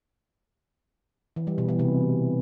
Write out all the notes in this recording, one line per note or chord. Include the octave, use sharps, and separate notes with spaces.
E3
G3
B2
E3
C3